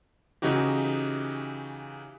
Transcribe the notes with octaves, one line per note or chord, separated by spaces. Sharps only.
C#3 E3 D#4 F#4 G4